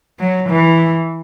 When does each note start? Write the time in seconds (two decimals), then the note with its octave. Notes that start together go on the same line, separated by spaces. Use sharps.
0.20 F#3
0.49 E3